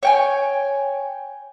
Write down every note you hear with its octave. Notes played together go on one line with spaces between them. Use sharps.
C#5 G5 G#5